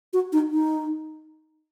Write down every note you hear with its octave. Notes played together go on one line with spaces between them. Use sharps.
F#4
D#4
D#4